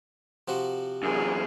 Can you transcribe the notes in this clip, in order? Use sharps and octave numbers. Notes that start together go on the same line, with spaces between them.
C3 F3 F#4
F#2 E3 G#4